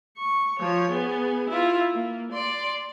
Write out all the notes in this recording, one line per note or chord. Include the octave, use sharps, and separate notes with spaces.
C#6
F3 C#5
B3 G#4
E4 F4
A#3
D5 C6